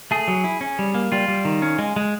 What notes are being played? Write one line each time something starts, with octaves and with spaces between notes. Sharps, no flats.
A3 G#4
F#3
E4
C#4
G3
A#3
G3 F4
G3
D#3
C#4
G#3
G#3